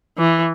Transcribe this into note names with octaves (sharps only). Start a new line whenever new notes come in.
E3